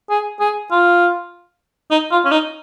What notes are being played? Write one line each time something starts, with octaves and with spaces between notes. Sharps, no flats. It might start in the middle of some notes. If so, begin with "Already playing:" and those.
G#4
G#4
F4
D#4
F4
C#4
D#4